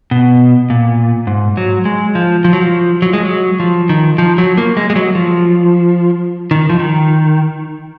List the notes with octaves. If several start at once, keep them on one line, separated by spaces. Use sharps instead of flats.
B2
A#2
G#2
F#3
G#3
F3
F3
F#3
F3
F#3
G#3
F#3
F3
D#3
F3
F#3
A#3
G#3
G#3
F#3
F3
D#3
F3
D#3